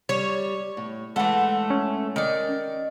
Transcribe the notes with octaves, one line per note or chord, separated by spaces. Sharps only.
G3 C#5
A2
A2 E3 G#3 A3 F#5
C#4
D#3 D5